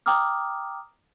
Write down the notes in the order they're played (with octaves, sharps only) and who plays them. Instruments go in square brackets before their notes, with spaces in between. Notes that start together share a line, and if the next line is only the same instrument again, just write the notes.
[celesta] G5 A#5 D6 D#6 F6